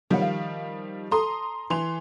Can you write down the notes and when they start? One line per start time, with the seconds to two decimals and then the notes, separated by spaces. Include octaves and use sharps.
0.10 D#3 F3 G3 C#5 F#5
0.22 F5
1.12 A4 A#5 C6 D#6
1.70 E3 C6 F7